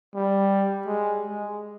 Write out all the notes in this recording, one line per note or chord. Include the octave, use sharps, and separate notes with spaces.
G3
G#3
G#3